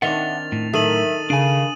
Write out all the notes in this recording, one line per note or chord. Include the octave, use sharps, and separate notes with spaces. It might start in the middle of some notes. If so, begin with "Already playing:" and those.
D#3 C4 D4 D#5 E5 F#5 A6 F7
A2
D#3 F#3 A4 A#4 E5 D#6 D#7 F#7
C#3 D4 G#5 D#7